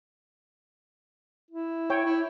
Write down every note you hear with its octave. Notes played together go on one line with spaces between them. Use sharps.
E4
C#5 G5
E4